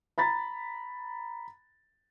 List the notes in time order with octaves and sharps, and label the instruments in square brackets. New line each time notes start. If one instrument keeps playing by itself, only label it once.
[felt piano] A#5 B5 A6